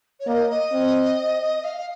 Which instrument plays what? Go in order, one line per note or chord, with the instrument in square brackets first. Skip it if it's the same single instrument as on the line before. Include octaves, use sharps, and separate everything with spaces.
[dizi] C#5
[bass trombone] A#3 [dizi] D#5
[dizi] D#5
[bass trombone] C4
[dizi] F5
F5